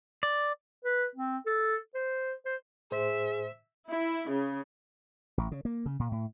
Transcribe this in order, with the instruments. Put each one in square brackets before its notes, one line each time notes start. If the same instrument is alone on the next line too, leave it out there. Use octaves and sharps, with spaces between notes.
[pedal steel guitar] D5
[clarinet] B4
C4
A4
C5
C5
[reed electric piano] A2 C5 [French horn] G#4 [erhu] E5
[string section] E4
C#3
[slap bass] A1
C#3
A#3
C#3
A#2
A2